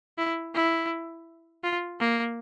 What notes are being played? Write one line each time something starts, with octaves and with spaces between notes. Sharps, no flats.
E4
E4
F4
A#3